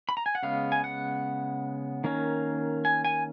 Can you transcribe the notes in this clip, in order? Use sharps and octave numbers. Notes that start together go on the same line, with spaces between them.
B5
A#5
G#5
F#5
C#3 G#3 B3 F5
G#5
F#5
D#3 A#3 C#4
G#5
G#5